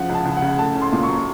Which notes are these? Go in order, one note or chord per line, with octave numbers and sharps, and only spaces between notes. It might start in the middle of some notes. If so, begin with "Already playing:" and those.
Already playing: C#3 F3 F#5
C#2
A5
C#2
F#5
C#3
A3 A5
C#4
C6
A#2
F#3 C#6